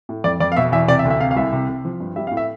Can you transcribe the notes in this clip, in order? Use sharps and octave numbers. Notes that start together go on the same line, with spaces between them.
A2
F2 D5
F2 D5
F5
B2 E5
E2 E5
C3 D5
E5
D2
E5
C3 F5
F5
C2 E5
C3
C3
F3
G2
G3 E5
F5
A2
E5